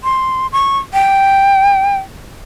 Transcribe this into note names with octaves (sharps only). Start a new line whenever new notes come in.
C6
C#6
G5